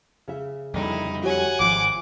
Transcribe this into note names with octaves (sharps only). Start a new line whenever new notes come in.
C#3 E5
F2 D3 G3 D#4 E4
F#4 G4 C#5 F#5 G#5
G#1 F3 D6